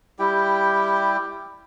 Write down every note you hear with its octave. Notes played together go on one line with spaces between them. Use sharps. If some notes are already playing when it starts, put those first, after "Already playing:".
G3 E4 G4 G5